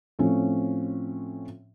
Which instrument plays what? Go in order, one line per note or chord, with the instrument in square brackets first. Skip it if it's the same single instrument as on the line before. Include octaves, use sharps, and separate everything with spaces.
[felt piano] A2 F3 C4 C#4